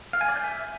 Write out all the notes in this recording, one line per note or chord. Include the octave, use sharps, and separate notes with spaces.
F5
G#5
D5
G6
E5